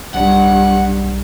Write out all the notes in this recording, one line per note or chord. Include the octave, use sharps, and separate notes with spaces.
B1 G2 F#5